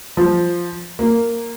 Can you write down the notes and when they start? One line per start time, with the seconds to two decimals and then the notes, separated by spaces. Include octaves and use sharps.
0.17 F3
0.99 A#3